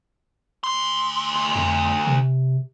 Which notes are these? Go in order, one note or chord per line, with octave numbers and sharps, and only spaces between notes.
D2 C6
F2
C3